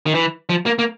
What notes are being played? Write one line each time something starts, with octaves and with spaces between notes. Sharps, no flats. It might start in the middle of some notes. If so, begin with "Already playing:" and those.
D#3
E3
F3
A#3
A#3